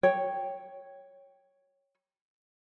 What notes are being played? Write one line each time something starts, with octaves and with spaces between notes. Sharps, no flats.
C#5 G5